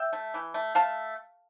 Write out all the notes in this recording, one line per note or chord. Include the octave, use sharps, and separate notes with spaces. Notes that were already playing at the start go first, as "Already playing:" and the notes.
Already playing: E5 G5
A3
E3
A3
A3 F5 A5